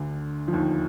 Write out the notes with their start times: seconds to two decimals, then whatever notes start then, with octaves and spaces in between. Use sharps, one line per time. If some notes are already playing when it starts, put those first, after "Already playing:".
Already playing: D2 D3
0.48 F3
0.53 D#2 D#3